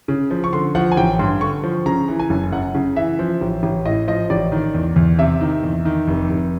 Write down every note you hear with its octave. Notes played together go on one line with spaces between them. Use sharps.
C#3
F3
C#6
D3 C6
F3 F#5
G#5
A1 G5
G2 C6
D3 C#6
F3
C#3 A#5
E3
G#5
F#1
F#2 F#5
C#3
E3 E5
F3
A1
A1
A2 D#5
F3 D#5
A1 D5
D#3
E2
E2
C3 E5
D#3
E2
D#3
F1
F1